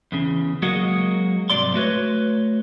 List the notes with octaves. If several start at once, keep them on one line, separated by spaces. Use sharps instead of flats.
E2 C#3
F#3 G#3 A#3 F#4 D#5
C2 F2 G#2 F#3 D5 C6
A3 F#4 B4 C#5